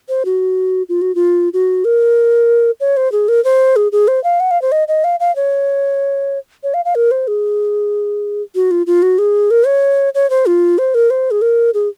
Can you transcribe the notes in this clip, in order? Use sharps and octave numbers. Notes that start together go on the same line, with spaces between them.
C5
F#4
F4
F#4
F4
F#4
A#4
C#5
C5
G#4
A#4
C5
G#4
G#4
C5
F5
F#5
F5
C5
D#5
D#5
F5
F5
C#5
C#5
F5
F5
A#4
C5
G#4
F#4
F4
F4
F#4
G#4
A#4
C#5
C#5
C5
F4
C5
A#4
C5
G#4
A#4
G#4